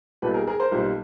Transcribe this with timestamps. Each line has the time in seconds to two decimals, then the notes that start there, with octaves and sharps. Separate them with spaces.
0.22 B1 A#2 G3 A4 B4
0.34 G#4 A#4
0.47 G#4 A#4
0.59 A#4 C5
0.72 B1 A#2 G3